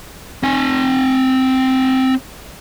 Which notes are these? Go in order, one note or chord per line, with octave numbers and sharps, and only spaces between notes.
C4 G#5